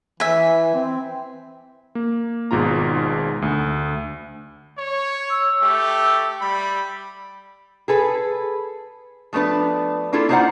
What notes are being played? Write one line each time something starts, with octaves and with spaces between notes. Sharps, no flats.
E3 E5 G#5
C4
A#3
G#1 G#2 B2 F4 A#5
D2
C#5
E6
A3 G4
G3 B5
G#4 A4 B4
F3 A3 B3 D4 B4
A#3 D4 E4 F4 A4
A#3 D#4 F4 C5 D5 F#5